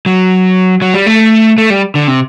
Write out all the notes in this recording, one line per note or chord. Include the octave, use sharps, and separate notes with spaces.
F#3
F#3
G3
A3
A3
G3
D3
C3